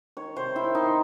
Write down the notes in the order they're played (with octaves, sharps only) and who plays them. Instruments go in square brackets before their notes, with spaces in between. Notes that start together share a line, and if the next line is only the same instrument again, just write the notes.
[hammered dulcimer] D#3 C#5
C3 C5
D#3 E4
D#3 D#4